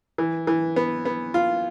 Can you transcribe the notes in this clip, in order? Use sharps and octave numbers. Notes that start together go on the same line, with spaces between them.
E3
E3
B3
B3
F4